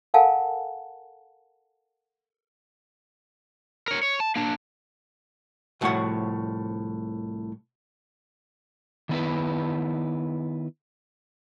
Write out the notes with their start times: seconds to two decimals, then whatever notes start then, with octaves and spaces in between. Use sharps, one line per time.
0.14 A4 A#4 F5 F#5 G#5 A5
3.88 A#4 C#5
4.03 C#5
4.20 A5
4.36 A#3 D4
5.81 C2 A2 F3 F#4 C#5 F#5
9.09 D#3 B3 E4 B4